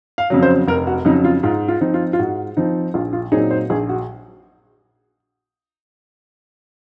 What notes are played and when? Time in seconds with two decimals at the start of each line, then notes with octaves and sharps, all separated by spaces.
0.18 F5
0.30 F2 C#3 F#3
0.43 C5
0.68 F1 A#4
0.87 F#4
1.05 F2 C#3 F#3 D#4
1.24 F4
1.43 G#2 F4
1.68 F4
1.81 F3 C4 D#4
1.94 F4
2.13 F4
2.19 G#2 F#4
2.57 F3 C4 D#4
2.94 A#1 F4
3.13 F4
3.32 A#2 F#3 C4 D#4 G#4
3.51 C5
3.70 A#1 G#4
3.89 F#4